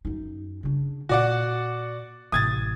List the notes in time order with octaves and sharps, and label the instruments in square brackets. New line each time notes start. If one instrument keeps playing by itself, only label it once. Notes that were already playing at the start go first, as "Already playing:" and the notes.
[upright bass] F#2 D#4
C#3 D4
[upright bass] A#2 [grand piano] F#4 D5 F#5
[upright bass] A1 C3 [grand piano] D#6 G#6 A6